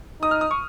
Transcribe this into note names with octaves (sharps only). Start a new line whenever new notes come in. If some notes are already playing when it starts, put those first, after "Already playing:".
D#4 D#6
F6
D#6
C#6